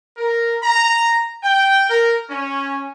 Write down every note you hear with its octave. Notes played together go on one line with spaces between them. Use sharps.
A#4
A#5
G5
A#4
C#4